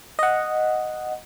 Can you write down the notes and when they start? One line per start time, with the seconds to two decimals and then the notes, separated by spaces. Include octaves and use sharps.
0.19 D#5 F#5